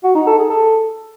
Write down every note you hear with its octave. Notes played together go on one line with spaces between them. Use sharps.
F#4
D#4
A4
G#4
A4